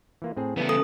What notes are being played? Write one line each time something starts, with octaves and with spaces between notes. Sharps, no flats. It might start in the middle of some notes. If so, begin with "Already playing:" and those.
E3 A#3 F4
A2 C4 G#4
C#3 E3 G3 A3 B3
A4 D#6